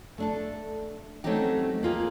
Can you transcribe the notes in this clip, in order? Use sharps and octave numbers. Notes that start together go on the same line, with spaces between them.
A3 D4 A4
F#3 A3 C4 C#4 D#4 G4
A#3 F4 G#4